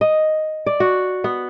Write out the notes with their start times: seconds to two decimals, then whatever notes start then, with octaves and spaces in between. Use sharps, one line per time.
0.01 D#5
0.66 D5
0.80 F#4
1.24 B3